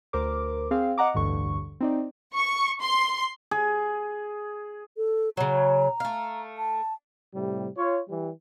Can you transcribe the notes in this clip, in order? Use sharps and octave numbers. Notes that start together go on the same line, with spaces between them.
D2 A#4 C5 D6
C4 G#4 F5
D#5 F#5 A#5 D6
A1 D2 G2 D3 C#6
C4 D#4 D5
C#6
C6
G#4
A4
C#3 F#3 A#5
A3 F5
A5
A2 C3 G3
F4 C#5
E3 G3